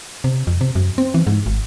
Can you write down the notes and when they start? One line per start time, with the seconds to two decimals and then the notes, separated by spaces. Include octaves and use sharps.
0.24 C3
0.47 F2
0.61 C3
0.75 F#2
0.98 C4
1.14 E3
1.27 G#2
1.46 G#1